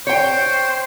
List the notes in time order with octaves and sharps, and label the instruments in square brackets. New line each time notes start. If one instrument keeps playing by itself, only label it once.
[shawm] C5 [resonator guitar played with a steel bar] C#5 G5